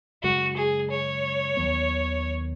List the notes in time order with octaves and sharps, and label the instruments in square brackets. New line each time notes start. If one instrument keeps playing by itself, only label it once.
[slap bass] F#2 C#3 G#3 [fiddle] F#4
[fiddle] G#4
C#5
[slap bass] D#2 D#3 F#3 B3